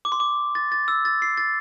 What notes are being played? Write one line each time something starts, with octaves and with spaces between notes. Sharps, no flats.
D6
C6
D6
A6
A6
E6
A6
C7
A6